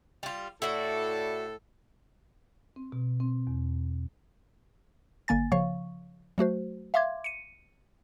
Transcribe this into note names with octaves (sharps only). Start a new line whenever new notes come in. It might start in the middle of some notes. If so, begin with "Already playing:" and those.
G3 F4
A2 E4 F#4 A4 D5
C4
B2
C4
E2
G1 D3 A#3 G#5 A6
C#3 F3 C#5 F5 C#6
F#3 A3 F#4 C5
E5 F5 C6 D6 G#6
C#7 D#7